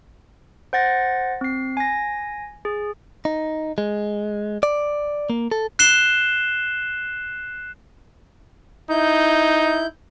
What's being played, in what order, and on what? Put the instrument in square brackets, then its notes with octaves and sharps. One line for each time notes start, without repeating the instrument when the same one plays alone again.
[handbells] C5 F#5 A6 A#6
C4 C7
G#5 A#6
G#4
[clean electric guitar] D#4
G#3
D5
A#3
A4
[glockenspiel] F#6 C7 E7 G7
[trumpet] D#4 [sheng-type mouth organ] E4 G6